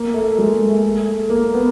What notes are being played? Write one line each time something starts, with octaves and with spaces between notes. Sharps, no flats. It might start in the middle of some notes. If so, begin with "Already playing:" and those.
Already playing: A#3
A3
G#3
A3
A#3
B3